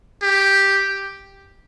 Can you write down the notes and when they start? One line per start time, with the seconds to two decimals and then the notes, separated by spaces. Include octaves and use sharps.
0.22 G4